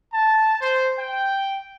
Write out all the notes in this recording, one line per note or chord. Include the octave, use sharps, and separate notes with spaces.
A5
C5
G5